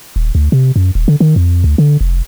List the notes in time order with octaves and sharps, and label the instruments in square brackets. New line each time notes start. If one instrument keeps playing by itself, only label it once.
[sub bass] D#1
D2
C3
F#2
D#1
D3
D#3
F2
D2
D3
F1